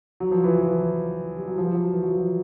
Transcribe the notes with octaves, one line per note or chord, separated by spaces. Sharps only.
F#3
F3
E3
F3
G3
F#3
F3
F#3
E3
F#3
F3